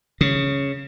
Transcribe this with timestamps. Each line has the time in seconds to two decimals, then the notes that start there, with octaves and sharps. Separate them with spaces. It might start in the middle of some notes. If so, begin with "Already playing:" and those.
0.21 C#3